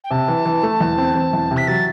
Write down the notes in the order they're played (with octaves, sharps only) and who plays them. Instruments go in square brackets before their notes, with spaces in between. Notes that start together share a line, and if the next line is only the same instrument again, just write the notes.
[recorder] G5
[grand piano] C3 [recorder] A5
[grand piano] E3
E3
A3
E2
C4
C4
E2
C3
[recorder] B6
[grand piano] F#3 [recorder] A6